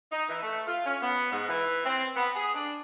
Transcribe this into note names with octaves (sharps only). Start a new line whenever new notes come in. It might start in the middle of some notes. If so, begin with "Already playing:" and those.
D#4
E3
A3
F4
C#4
B3
G#2
E3
C4
B3
G#4
D4